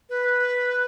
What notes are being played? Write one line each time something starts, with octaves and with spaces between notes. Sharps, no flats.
B4